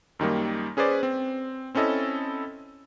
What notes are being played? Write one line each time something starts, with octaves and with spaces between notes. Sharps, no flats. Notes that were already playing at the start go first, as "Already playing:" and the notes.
F#2 D#3 G3 A#3
C#4 G#4 B4 C5 D5
C4
C4 C#4 E4 A4 D#5